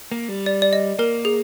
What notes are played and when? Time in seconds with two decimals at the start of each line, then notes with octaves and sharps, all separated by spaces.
0.11 A#3
0.29 G3
0.46 D5
0.62 D5
0.73 D#5
0.99 A#3 A#4
1.25 G#4